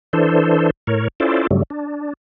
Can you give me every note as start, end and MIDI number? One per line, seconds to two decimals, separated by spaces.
0.13 0.70 52
0.13 0.70 62
0.13 0.70 69
0.13 0.70 72
0.87 1.08 45
0.87 1.08 70
0.87 1.08 73
1.20 1.47 61
1.20 1.47 64
1.20 1.47 65
1.20 1.47 69
1.20 1.47 72
1.20 1.47 74
1.51 1.63 43
1.51 1.63 49
1.51 1.63 54
1.51 1.63 55
1.51 1.63 57
1.70 2.13 62